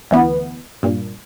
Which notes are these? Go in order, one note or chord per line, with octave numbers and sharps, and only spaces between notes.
D2 E3 B3
G2 A#2